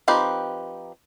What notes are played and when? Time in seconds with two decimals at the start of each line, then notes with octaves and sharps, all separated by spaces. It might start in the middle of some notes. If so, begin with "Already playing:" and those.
0.08 F3 C4 D#4 G4 B4